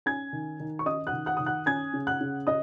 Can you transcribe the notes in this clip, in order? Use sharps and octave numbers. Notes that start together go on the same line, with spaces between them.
C#4 G#5 G#6
D#3
D#3
C#6
C#4 D#5 D#6
F#5 F#6
D#3
F#5 F#6
D#3 D#6
F#5 F#6
C#4 G#5 G#6
C#3
F#5 F#6
C#3
C#4 D#5 D#6